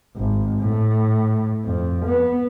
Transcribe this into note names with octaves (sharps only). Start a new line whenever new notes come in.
G#1
A2
F2
B3